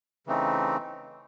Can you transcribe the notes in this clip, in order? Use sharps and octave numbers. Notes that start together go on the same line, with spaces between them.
C#3 E3 A3 C4 D#4